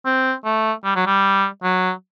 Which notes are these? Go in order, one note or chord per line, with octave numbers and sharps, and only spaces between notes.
C4
A3
G3
F#3
G3
F#3